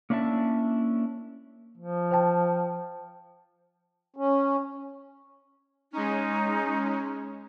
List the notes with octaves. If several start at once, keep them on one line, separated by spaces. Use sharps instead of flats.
A#3 C#4 D4 E4 E5 A5
F3
C5 G5 A5
C#4
G#3 C#4 D#4